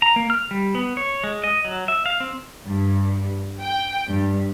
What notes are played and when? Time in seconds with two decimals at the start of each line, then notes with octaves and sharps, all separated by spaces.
0.02 A#5
0.16 A#3
0.30 F6
0.51 G3
0.75 B3
0.97 C#5
1.24 G#3
1.44 D#5
1.65 F#3
1.88 E5
2.06 F5
2.20 C4
2.66 G2
3.61 G5
4.10 G2